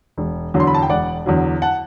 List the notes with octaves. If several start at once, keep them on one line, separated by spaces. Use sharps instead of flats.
E1
E2 D3 F#3
C6
B5
A5
G5
E1 D5 F#5
E2 D3 F#3
F#5 A5